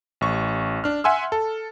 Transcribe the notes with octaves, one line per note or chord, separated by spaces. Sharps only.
A1 C#6
D4 F6
E5 F#5 G#5 C6 E6
A4